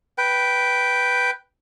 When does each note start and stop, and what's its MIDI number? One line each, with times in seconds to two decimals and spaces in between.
0.18 1.31 71
0.18 1.31 79